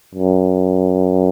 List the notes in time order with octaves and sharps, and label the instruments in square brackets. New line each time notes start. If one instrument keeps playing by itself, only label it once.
[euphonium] F#2